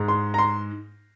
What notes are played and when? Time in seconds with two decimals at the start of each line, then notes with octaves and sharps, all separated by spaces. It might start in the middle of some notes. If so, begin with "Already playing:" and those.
Already playing: G#2 G#3
0.08 C6
0.34 A#5
0.38 C6